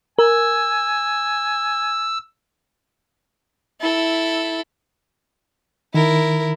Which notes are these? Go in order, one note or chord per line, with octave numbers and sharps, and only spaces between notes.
A#4 G#5 E6
E4 A4
D#3 E4 A#4